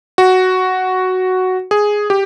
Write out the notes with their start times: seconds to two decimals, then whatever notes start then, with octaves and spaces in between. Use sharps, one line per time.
0.18 F#4
1.71 G#4
2.10 G4